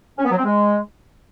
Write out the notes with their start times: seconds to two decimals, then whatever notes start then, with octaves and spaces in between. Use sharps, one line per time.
0.18 C#4
0.25 B3
0.31 F#3
0.38 C4
0.44 G#3